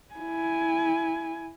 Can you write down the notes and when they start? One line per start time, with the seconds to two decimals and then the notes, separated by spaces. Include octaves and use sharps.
0.15 E4 G#5